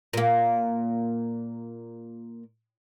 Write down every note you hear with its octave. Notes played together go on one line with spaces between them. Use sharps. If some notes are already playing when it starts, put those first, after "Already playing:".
A#2 A#3